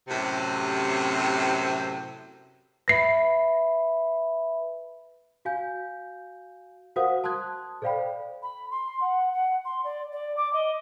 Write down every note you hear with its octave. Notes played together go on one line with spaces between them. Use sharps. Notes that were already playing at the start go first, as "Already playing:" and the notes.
F#2 A2 C3
B4 E5 B5 A#6 C7
F#4 F5 G#5 G6
F#4 A#4 C5 F5 F#5 D#6
A5 C6 D#6 F#6 G#6
A4 C5 D5 F5 G5 B5
B5
C6
F#5
F#5
C6
D5
D5
D6
D#5